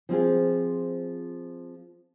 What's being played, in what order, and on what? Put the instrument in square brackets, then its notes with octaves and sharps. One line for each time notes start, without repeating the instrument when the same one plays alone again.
[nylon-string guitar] F3 C4 F4 G#4